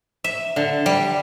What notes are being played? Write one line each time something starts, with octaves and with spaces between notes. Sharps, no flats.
E5
D3
G3